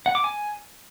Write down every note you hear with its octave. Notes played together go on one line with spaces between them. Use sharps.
F#5
D6
G#5